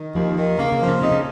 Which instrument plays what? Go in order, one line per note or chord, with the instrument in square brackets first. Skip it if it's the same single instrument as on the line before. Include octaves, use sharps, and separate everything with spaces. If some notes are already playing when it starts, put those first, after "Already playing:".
Already playing: [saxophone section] D#3
[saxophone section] D#2 [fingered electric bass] F3
[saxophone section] D#3
[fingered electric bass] C#3 [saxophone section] A#3
[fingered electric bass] C#3
[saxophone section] F3
[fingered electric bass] C#3
[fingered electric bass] C3 [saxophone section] D#4
[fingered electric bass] C#3